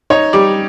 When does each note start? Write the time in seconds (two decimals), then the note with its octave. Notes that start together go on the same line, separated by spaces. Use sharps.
0.10 D#4 C#5
0.33 G3 D5